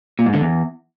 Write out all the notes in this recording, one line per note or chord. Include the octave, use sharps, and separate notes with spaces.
A#2
G#2
D3
E2